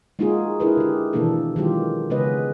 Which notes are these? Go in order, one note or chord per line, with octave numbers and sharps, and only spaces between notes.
G#3 A#3 D#4 F4 F#4 G#4
D4 E4 G#4 A#4 B4
D3 G4
B2 D#3 E3 A#3 D4 A4
D#3 E3 F#3 G#3 F4 G4
C#3 G#3 B3 C#4 B4 D#5